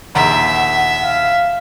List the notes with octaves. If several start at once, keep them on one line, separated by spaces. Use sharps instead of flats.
A#1 D#2 E5 F#5 A#5
F5